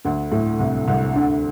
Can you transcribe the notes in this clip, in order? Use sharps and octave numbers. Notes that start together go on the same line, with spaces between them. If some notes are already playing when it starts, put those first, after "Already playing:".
D2 D3
A2
C2 C3
C2 C3
D2 D3